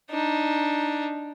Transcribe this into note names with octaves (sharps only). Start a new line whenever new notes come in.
D4 D#4